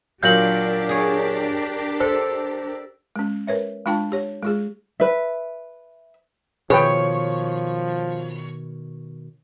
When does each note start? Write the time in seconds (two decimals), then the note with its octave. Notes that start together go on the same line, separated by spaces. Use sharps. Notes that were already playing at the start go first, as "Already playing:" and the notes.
0.23 A#2 F#3 D4 G4 A#4 F5 G6 F#7
0.89 G#4 C#5
2.00 A4 C5
3.16 G#3 C#4
3.47 A#4 B4 C#5 E5
3.86 G#3 D4 F4 G5 A5
4.12 G4 C#5
4.43 G#3 F4 G#4
5.00 B4 E5
6.70 B2 D#3 F3 G#4 B4 C#5 G5